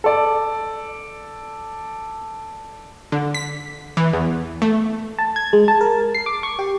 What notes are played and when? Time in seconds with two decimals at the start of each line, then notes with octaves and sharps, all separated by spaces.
0.04 A4 D5
3.12 D3
3.35 B6
3.97 E3
4.13 E2
4.62 A3
5.18 A5
5.36 G#6
5.53 G#3
5.68 A5
5.81 A#4
6.15 C7
6.26 D6
6.43 C#6
6.59 G4